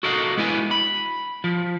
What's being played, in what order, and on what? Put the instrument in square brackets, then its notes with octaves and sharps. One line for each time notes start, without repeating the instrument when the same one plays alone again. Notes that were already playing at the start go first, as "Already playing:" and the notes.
[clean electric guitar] F#4 A4 A#4 D#5 F5 F#5
G#3 B3 E4 G#5
B5
F3